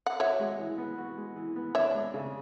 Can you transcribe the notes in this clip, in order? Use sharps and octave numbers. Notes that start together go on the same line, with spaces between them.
F#5
F#4 C#5 E5
G#3
E3
B3
F#4
G#3
E3
B3
D4 C#5 E5
G#3
C#3